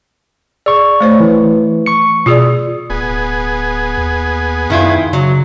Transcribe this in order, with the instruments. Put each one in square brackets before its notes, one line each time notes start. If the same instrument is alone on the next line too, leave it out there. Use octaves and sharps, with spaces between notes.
[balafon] G#4 [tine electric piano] D5 C#6
[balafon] A3 C5 C#5
[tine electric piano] E3
C#6 C#7
[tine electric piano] B2 D#6 [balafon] F4 G#4 D5
[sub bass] D1 [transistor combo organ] B3 G#4
[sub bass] D#2
[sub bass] F#2 [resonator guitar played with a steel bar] D#3 E4 F4
[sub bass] C#3 [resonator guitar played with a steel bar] F#3